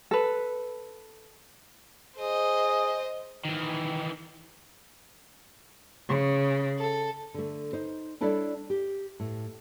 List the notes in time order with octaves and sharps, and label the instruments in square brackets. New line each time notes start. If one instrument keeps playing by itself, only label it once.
[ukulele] A4 B4
[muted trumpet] G#4 [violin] C5 D#5
[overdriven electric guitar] D#3 E3
[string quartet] C#3
A4
[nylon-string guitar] D3 A3
D#4 C5
G3 D4 E4 A4 C#5 D5
G4
A2